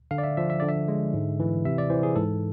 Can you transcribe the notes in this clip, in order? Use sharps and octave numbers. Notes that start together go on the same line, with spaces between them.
D3 F5
D5
E5
F3 E5
E5
D3 D5
E5
G#3
G#2
E3
C3 E5
D5
E3 C5
G#4
G#2 A4